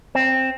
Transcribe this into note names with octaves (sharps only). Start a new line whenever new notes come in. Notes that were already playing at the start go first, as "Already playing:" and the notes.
C4